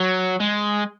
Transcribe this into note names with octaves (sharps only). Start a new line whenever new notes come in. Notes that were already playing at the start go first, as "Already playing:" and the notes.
Already playing: F#3
G#3